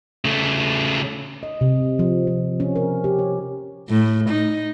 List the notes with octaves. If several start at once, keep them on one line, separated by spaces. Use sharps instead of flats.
C#3 A3
D#5
C3
F3
F3
C#4
A#4
G4
C#5
A2
D#4